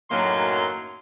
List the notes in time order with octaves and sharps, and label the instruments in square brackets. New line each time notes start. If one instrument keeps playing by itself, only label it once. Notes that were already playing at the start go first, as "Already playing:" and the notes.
[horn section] F#2 A2 D#3 F#3 A#3 C6